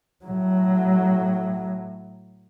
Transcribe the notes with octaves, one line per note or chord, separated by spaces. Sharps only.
A2 F#3